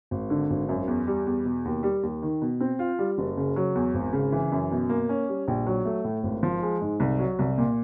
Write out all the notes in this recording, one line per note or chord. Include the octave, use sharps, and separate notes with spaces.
G#1
D3
G#1
F#2
E2
G3
E2
B2
D#2
G3
D#2
D#3
B2
C4
F4
G3
F#1
C#3
F#3
E2
G#1
C#3
E3
F#2
B2
A#3
C#4
G3
A#1
F#3
A3
A2
G#1
F3
G#3
G#2
C2
F#3
C2
A#2